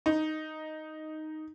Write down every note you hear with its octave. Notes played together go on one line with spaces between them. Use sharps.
D#4